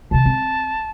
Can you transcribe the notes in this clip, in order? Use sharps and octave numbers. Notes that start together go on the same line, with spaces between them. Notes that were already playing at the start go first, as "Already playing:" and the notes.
C3 D#3 A5
C4